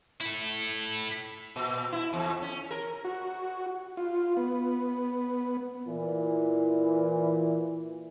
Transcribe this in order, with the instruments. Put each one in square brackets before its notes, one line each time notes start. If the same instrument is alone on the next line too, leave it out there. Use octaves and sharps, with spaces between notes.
[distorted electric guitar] E4 A4
[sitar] A#2
E4
E2
C#4
A#4
[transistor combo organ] F#4
F4
B3
[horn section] A#2 E3